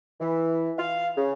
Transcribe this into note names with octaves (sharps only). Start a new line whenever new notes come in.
E3
F5
C#3